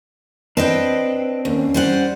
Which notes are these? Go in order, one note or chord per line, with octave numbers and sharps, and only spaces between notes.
C4 D4 B4 D#5 G5
D#2 C#4
G3 C5 F#5